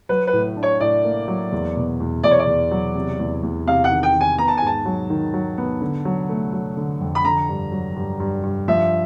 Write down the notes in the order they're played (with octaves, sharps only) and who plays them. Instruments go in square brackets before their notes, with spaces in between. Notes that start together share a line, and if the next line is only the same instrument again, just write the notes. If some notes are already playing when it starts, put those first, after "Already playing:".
[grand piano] F#3 [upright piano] B4
[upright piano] B4
[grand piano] A2
D4
[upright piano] C#5
[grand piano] A2 [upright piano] D5
[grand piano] A#3
F#3
E2
B2
E2
[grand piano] E2 [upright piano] D5
[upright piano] C#5
D5
[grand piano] E2
F#3
C3
E2
E2
[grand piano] C3 [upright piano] F5
[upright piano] F#5
[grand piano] D#3
[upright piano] G5
[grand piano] D#3
[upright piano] G#5
[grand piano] B3 [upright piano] A#5
[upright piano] A5
G#5
[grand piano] G#2 [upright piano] A5
[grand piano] F#3
D#3
F#3
B3
D3
F#3
A3
F#3
D3
F2
[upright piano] B5
[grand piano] D3 [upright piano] A#5
[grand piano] G2
F#3
G2
G2
G2
[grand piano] F3 [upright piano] E5